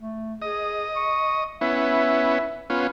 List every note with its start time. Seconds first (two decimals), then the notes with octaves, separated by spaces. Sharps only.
0.01 A3
0.42 G#4 D#5
0.96 C#6
1.61 B3 C#4 E4 E5
2.70 B3 C#4 F4